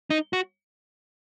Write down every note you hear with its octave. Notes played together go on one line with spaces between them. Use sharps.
D#4
F#4